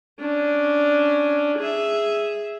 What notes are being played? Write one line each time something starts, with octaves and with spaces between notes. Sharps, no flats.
C#4 D4
G#4 E5